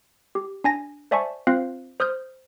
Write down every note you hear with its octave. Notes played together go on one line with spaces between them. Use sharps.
G4
D4 G#5 A#6
C5 D5 E5 G#5 A5 C#6
C4 F4 C5 F5 F#6
C5 D#6 F6 G6